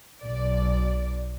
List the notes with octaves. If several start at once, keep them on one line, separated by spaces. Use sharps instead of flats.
B1 D5